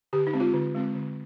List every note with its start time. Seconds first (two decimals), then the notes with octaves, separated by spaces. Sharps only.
0.13 D3 G4
0.27 D#4
0.33 G#3 C4
0.40 F4
0.54 D3
0.74 G#3 C4
0.95 D3